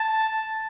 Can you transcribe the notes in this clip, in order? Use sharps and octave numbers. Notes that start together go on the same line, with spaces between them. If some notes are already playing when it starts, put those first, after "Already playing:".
Already playing: A5